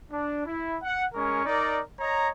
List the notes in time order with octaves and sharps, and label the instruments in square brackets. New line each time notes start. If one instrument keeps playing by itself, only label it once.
[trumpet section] D4
E4
F#5
G#3 C#4 A#4 C#6
D#4 A#4 D5
C#5 D#5 A#5